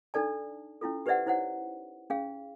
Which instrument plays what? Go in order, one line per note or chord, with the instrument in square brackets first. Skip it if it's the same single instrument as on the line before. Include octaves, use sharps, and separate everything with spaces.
[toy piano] D4 D#4 A4 D5 A5
C#4 E4 F4 A4
G4 B4 C5 D5 E5 F#5
D#4 E4 C5 C#5 F#5
C#4 G#4 F5